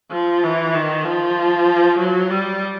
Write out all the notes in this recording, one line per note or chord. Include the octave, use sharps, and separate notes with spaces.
F3
E3
D#3
F3
F#3
G3